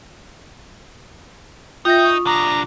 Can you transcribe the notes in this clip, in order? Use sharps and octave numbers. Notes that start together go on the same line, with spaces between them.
D#4 F4 E5 G5 G6 A#6
C#6 D#6
C2 D4 A#5